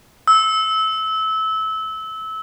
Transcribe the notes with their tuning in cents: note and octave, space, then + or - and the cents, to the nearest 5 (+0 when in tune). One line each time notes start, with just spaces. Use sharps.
E6 -25